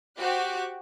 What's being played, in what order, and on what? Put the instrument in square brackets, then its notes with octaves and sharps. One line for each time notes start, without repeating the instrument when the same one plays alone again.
[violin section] F#4 G4 C5 D6 F#6